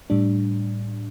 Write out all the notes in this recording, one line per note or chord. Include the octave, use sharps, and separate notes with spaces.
A2 G3 D4